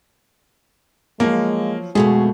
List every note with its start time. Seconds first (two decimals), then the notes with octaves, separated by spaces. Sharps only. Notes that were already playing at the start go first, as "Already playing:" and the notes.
1.20 F3 F#3 G#3 A#3
1.95 F2 B2 G#3 A3 F#4 G#4